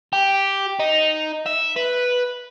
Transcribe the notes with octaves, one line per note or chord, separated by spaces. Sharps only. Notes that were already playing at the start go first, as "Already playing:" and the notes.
G4
D#4
E5
B4